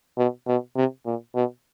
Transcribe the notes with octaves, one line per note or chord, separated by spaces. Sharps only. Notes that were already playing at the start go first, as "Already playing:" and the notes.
B2
B2
C3
A#2
B2